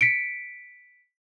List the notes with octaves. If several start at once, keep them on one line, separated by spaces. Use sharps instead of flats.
B6 C#7 D7